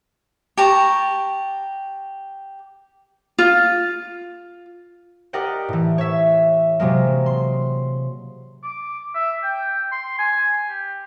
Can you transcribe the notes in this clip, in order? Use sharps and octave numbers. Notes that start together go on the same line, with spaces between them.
G4 A5 A#5 C#6
F4
G4 A#4 D5 D#5 F#5 G5
A2 E3
C#5 E5
C3 F#3 G#3 A#3
C6
D6
E5
G5
C6
G#5
G4